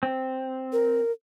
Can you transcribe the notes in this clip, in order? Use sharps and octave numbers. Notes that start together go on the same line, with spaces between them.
C4
A#4